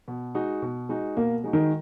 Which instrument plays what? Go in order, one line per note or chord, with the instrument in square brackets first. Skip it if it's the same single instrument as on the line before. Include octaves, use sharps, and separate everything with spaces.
[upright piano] B2
G#3 D#4 F#4
B2
G#3 D#4 F#4
[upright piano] B2 [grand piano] A#3
[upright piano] G#3 D#4 F#4
[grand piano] D#3